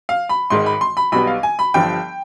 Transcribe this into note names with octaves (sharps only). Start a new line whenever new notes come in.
F5
B5
G#1 G#2 D#3 G#3 C6
B5
C6
B5
B1 B2 G3 B3 B5
F5
G#5
B5
G1 G2 F3 G5